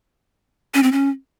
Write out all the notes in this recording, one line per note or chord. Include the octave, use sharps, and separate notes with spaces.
C#4
C4
C#4